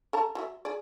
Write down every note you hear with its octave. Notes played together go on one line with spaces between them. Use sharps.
A4 A5 A#5
F#3 A4 E5
G#4 D5